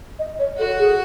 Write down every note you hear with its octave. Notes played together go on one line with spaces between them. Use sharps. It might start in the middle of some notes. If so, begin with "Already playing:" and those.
D#5
C#5
F#4 A4
G#4